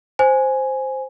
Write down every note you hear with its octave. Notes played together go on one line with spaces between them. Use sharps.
C5 G#5